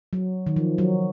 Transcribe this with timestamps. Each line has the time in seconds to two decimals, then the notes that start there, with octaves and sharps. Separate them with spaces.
0.13 F#3
0.47 D#3
0.56 F3
0.78 F#3